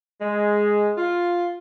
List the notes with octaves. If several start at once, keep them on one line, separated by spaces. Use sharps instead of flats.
G#3
F4